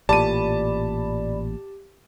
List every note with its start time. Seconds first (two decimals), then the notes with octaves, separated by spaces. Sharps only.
0.09 A1 A#2 G4 D5 A5 B5 D#7